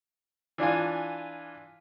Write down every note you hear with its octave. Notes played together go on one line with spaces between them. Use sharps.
E3 D4 F4 G#5